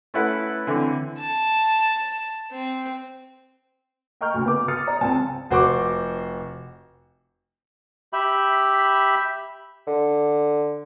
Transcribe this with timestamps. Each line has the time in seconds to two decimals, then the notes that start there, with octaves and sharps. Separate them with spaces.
0.14 A3 C#4 E4 B4 F#5
0.67 D3 E3 C4
1.19 A5
2.52 C4
4.21 D#5 G5 A#5 C#6 F6 G6
4.34 D2 C#3
4.46 B3 D6
4.68 D#6 F6 A6 C#7
4.87 C5 D5 A#5
5.01 C#2 C4 G#5 A5
5.51 F1 F#4 C5 C#6 D6
8.13 G4 E5 B5
9.87 D3